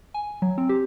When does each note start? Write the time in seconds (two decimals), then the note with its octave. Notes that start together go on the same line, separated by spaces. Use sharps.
0.14 G#5
0.42 F#3
0.58 C4
0.69 G4